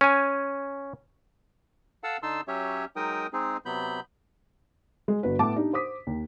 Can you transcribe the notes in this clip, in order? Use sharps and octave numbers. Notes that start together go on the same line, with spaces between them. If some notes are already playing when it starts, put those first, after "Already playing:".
C#4 G#5
A4 F5 F#5 A5 E6
D3 D#4 A5 C6 E6
F#3 C#4 G4 C#5 E5
F#3 G#3 D#4 A#4 G5 D#6
G#3 C4 D#4 G#4
C3 F#3 B3 B5 G6
G#3
G1 F#4 B4
A2 B3 A5 D6
D4 D#4 G4
C5 D6 D#6 B6
D#2